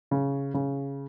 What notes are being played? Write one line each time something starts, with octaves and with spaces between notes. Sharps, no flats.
C#3
C#3